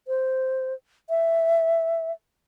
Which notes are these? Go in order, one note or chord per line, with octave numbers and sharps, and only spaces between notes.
C5
E5